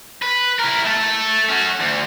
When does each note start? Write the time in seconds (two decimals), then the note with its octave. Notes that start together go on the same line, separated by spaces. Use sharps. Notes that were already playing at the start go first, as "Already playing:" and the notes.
0.22 B4
0.59 E4 A#4
0.85 A3 A4
1.49 C#4 F#4
1.80 D2